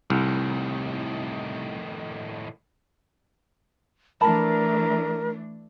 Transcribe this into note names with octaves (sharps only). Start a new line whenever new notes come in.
C2 A2 D#3
E3 A3 D4 A#4 A5 B5